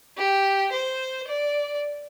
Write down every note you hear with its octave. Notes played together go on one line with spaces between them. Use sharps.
G4
C5
D5